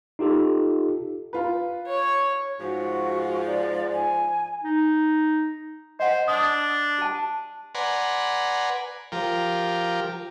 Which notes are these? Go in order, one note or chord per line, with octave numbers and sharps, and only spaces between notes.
D#4 F4 G4 A4
F4 B4
C#5
G#2 F3 F#4
D5
G#5
D#4
C5 D#5 F#5
D4 D#6
G4 A5
B4 D5 F#5 G#5 A#5 C6
F3 G4 A#4